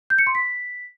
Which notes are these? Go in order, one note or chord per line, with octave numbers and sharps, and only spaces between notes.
G6
C#7
C6
B6